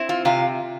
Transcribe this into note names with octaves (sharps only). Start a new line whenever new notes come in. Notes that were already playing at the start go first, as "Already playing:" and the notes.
Already playing: C4 E4
F4
C3 F4